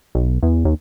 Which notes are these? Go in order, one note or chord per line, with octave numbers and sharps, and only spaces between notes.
B1
E2
D#2